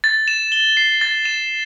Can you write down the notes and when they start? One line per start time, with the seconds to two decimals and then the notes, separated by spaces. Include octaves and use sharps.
0.04 A6
0.28 E7
0.52 G7
0.77 C7
1.01 A6
1.25 E7